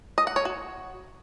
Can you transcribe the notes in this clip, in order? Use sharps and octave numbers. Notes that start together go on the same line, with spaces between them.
D#5
F#5
C#5
F#4